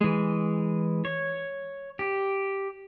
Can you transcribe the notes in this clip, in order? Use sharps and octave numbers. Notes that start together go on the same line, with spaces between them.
E3 G#3
C#5
G4